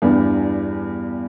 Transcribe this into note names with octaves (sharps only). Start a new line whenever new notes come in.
E2 G2 E3 G3 B3